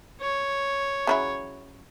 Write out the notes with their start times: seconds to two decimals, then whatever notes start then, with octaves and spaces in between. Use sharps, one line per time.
0.21 C#5
1.07 C#3 F#3 E4